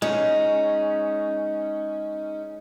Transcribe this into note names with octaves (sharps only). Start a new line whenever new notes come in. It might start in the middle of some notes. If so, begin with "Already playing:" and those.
G#3 C#4 D#4